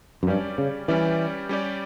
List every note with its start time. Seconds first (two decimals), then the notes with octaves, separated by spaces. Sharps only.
0.23 F#2
0.27 G2 G3 C#4 G4 D5
0.58 C#3
0.88 E3 G3 C#4 G4 D5
1.49 G3 C#4 G4 D5